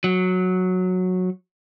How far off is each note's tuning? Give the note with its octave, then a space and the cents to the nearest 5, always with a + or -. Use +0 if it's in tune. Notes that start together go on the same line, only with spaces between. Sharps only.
F#3 -10